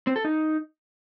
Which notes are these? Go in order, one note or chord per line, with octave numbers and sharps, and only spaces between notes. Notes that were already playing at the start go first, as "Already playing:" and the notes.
C4
A4
D#4